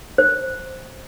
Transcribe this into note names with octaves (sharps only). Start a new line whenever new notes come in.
C5